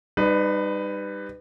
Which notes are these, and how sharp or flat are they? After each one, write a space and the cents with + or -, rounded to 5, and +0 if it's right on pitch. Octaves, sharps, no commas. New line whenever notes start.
G3 +15 D#4 -20 B4 +15